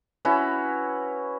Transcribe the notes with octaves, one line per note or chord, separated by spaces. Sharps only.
C#4 E4 F#4 B4